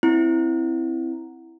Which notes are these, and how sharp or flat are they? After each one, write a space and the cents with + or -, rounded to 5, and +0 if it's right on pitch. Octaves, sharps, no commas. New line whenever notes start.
C4 +0 E4 +0